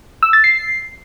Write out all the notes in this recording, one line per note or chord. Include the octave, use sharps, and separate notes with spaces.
E6
A6
C7